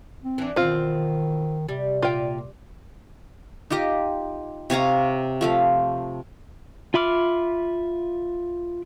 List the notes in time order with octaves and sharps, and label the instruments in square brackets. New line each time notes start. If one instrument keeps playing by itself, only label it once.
[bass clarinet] C4
[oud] E3 D4
[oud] E2 B2 [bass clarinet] D#3 [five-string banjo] C4 F4
[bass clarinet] C3 [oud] G3
[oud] A#2 [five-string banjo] F4 G5
[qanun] D#4 F4 G4 D#5
C3 C#5 F5 A#5
F3 A3 F5
[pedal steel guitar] F4 E5 B5 D6 F6